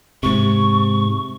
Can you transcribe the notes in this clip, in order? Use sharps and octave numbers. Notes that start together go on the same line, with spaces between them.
G#2 C3 C#6